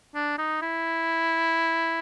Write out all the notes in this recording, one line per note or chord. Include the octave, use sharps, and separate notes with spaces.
D4
D#4
E4